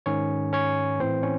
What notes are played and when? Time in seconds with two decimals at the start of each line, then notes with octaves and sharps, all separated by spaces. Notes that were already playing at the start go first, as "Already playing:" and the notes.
0.06 G#2 D#3 C#4 C#5
0.53 C#4 C#5
1.00 A2 E3 C4 C5
1.23 C#4 C#5